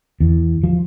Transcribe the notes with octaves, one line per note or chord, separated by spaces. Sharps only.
E2
F3